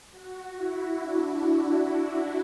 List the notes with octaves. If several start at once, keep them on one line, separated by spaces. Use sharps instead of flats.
F#4
E4
D4